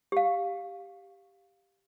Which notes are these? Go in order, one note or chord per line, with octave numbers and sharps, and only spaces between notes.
G4 F5